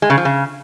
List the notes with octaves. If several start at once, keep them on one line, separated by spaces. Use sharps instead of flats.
G#3
C#3
F3
C#3